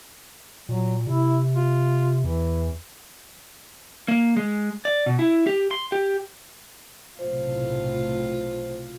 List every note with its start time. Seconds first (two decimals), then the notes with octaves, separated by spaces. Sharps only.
0.69 A#2 F#3
1.07 C3 E4
1.56 F4
2.24 E2 E3
4.08 A#3
4.37 G#3
4.85 D5
5.06 B2
5.19 E4
5.47 G4
5.71 C6
5.92 G4
7.19 B1 A2 C3 F4 C5